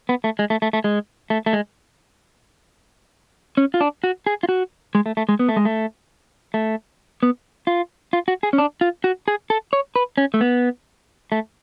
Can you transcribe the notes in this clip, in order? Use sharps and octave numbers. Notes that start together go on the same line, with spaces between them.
B3
A3
G#3
A3
A3
A3
G#3
A3
A3
G#3
C#4
F4
D4
F#4
G#4
F4
F#4
G#3
A3
A3
G#3
B3
A3
G#3
A3
A3
B3
F4
F4
F#4
G#4
C#4
D4
F4
F#4
G#4
A4
C#5
B4
C#4
A3
B3
A3